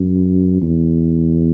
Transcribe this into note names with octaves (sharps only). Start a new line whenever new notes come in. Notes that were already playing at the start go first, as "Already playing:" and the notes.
Already playing: F#2
E2